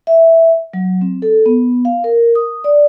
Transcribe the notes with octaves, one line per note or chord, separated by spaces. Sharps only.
E5
F#3
C4
A4
B3
F5
A#4
D#6
D5